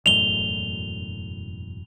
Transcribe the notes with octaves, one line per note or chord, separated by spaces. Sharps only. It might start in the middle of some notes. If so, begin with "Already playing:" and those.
E1 F#2 A2 F7 G7